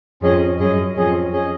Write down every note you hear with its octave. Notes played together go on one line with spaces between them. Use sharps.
F2 C#4 G#4 D#5
F#2 C#4 G#4 D#5
F2 C#4 G#4 D#5
C#4 G#4 D#5